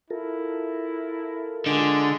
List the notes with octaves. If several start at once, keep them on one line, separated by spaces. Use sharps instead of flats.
E4 F4 A4 A#4
D3 G#3